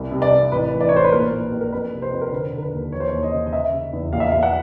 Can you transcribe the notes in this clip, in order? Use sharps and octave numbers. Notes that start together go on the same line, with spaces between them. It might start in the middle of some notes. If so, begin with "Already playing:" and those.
Already playing: C2
C3
D5
C3
A1 B4
E3
D5
C#5
A1 C5
B4
A#2 A#4
A#2
A#1
A#4
F2 B4
C3
C5
F2
A#4
D3 B4
D3
A#4
B4
D#2
E3 C#5
C5
C#5
D#2
D#5
C#3
D#5
C#3 E5
C#3
E2
A#1 F5
E5
F5
A#1
F#5